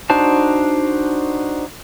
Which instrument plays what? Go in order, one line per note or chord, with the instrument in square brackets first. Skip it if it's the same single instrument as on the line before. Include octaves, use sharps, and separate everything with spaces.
[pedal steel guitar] D4 D#4 F#4 C5 A5